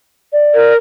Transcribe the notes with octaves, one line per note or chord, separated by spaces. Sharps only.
D5
A#4